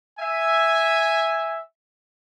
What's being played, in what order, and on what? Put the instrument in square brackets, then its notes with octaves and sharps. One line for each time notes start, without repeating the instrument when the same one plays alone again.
[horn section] E5 G#5